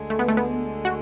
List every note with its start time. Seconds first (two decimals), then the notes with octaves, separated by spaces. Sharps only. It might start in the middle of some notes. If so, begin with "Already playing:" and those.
Already playing: D2 D3 G#3
0.10 A3
0.19 B3
0.28 A3
0.37 B3
0.85 F#4